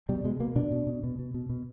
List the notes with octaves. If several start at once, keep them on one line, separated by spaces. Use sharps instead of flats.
B2 G3
B2 G#3
B2 A#3
B2 D4
B2
B2
B2
B2
B2
B2